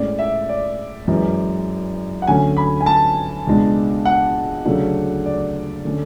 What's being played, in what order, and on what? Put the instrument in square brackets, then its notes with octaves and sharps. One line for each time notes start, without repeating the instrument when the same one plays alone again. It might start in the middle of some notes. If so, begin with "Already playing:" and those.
Already playing: [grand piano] A2 G#3 C#4 D5
E5
D5
F#2 E3 G#3
F#5
D2 D3 F#3 C#4 G#5
B5
G#5
A5
C#2 B2 G#3 D4
F#5
D2 C#3 F#3 A3 D4
D5
D3 A3 C#4